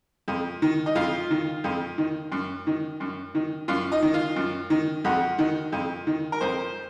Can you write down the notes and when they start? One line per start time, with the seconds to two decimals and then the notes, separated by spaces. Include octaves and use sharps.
0.28 F2
0.62 D#3
0.86 D#4
0.95 F2 F4
1.30 D#3
1.64 F2
1.98 D#3
2.32 F#2
2.67 D#3
3.00 F#2
3.35 D#3
3.68 F#2 F4
3.92 D#4
4.03 D#3
4.14 F4
4.36 F#2
4.70 D#3
5.04 F2 F#4
5.38 D#3
5.72 F2
6.07 D#3
6.32 A#4
6.41 F2 C5